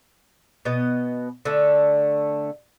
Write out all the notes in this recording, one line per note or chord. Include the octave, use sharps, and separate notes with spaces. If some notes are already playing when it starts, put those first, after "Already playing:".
B2 B3 D#5
D3 A3